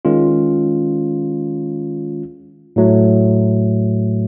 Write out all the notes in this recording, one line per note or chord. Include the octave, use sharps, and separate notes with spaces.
D#3 G#3 C#4 F4
A2 F#3 A3